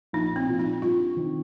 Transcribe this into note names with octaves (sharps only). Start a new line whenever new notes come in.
A#1 D#4
C4
A#2 F3
D#4
G2 F4
D#3 C4 D#4